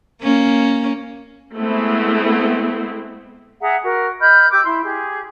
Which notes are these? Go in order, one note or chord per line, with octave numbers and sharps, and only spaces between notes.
A#3 C#4
G#3 A3 B3 C4 E4
G#4 E5 F#5 A#5
F#4 A#4
D#5 B5 F6 G6
G4 D6 E6 G6
E4 C6
G4 G#4